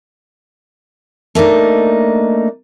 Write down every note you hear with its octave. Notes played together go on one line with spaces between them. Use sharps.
A3 A#3 D4 D#4